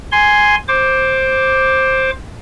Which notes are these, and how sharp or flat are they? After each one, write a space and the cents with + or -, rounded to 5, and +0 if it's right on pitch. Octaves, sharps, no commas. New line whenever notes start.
G#5 +0 C6 +0
C5 +10 D6 +0